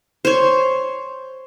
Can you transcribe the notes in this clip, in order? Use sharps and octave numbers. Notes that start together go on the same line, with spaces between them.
C5 C#5